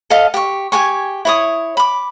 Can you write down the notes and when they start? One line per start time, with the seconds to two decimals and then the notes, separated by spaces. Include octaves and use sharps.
0.10 A4 D#5 F5
0.34 G4 C#6
0.72 G4 G#4 G#5 C#6
1.25 E4 C#5 D#6
1.77 B5 D6